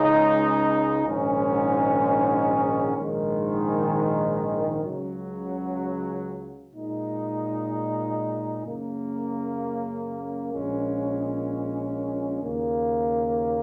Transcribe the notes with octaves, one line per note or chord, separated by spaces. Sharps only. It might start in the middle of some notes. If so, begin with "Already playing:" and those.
Already playing: C#2 C#3 G#3 D#4
A#1 G#2 D#3 G#3 C#4
A#1 G#2 D#3 G#3
C#2 C#3 F#3
A#2 G#3 D#4
F#2 C#3 A#3
A#1 A#2 G#3 C#4
D#2 C#3 A#3